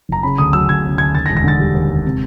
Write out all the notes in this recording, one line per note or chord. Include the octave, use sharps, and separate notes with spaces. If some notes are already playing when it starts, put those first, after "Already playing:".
F#1 A#5
C#3 B5
D2 D#6
F#3 E6
D2 G#6
C#3
D2 G#6
D#2 A6
A#6
E1
A#6
D3 A6
G3
D#2
E1
C3